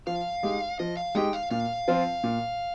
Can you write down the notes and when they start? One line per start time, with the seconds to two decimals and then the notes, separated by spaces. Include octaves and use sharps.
0.07 F3 F5
0.43 G#3 D#4 G4
0.79 F3 D#5
0.97 F5
1.15 G#3 D#4 G4 G5
1.33 F5
1.51 A#2 F5
1.88 F3 C4 F4
2.24 A#2